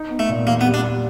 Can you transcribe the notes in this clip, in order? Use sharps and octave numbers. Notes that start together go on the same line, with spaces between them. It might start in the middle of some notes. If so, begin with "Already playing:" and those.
Already playing: D#4
B3
A3
A#2
E2 A#3
B3
G3
D4
G3